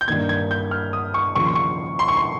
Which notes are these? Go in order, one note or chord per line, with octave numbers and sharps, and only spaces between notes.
G6
G2 D#3 A#3 G#6
G#6
G6
F6
D#6
C#6
D#2 C#3 F3 C#6
C6
C#6
C6
C#6
C6